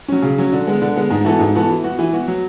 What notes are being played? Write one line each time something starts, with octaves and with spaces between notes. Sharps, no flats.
F#3 C#4
C#3
F#3 C#4
D3
G#3 B3
D3
G#3 B3
G#2
E3 B3 F#4 A4
G#2
E3 B3 F#4 A4
E3
B3 F#4
E3
B3 F#4
F#3